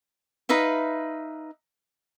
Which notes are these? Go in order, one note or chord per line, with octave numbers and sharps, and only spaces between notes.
D#4 B4 E5 F5